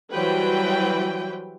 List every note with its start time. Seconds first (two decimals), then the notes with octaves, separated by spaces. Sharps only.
0.11 E3 F#3 G3 B4 C5 G5